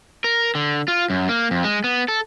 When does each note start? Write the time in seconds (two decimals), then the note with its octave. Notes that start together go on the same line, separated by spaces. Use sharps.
0.24 A#4
0.55 D3
0.88 F4
1.10 F#2
1.29 A#3
1.51 F2
1.64 G#3
1.84 B3
2.08 A4